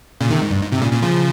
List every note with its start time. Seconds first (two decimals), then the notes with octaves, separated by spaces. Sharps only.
0.21 A#2 C#3
0.31 C3 D#3
0.41 G#2
0.51 G2
0.61 G#2
0.72 G#2 C3
0.82 A#2 C#3
0.92 A#2 C#3
1.03 C#3 F3